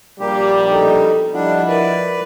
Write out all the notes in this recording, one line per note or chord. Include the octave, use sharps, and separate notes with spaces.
A#1 G3 A#3 G4
B2 D#4 A4
F3 G3 D4 E4 D#5 F#5
A#4 B4 D5